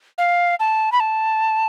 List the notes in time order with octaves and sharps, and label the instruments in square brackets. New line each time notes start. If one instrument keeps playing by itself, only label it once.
[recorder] F5
A5
B5
A5